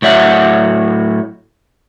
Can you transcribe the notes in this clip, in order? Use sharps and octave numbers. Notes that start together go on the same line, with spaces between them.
A2 F#3 E5 F#5